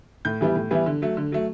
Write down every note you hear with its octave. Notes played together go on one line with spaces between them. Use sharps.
A2 G6
E3 G3 B3 E4
A2
E3 G3 B3 E4
D3
F#3 A3
D3
F#3 A3